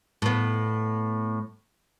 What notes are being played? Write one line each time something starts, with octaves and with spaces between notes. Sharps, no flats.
A2 B3